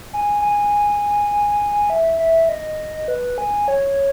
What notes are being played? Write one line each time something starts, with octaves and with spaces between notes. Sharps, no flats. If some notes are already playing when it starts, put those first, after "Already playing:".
G#5
G#5
E5
E5
D#5
B4
G#5
C#5